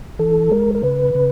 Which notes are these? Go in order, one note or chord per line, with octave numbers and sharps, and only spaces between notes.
E3 A4
G#3 A#4
A#4
C#3 B4
C#3